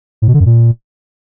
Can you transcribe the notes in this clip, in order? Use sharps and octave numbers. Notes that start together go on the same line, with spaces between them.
A2
B2
D3
F#2
A#2